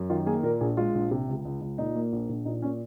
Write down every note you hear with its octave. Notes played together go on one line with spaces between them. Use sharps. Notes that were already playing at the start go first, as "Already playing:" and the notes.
Already playing: F#2
D#3 F4
A#3 G#4
A#2 A#4
A#1 G#4
G#3 F4
A#1
C3
C#2
C#2
C#2
A#2 D#4
A#3
A#1
A#1
A#2 D#4
A#2 C#4